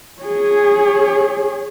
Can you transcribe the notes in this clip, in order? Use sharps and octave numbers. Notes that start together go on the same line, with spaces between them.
G#4 C#5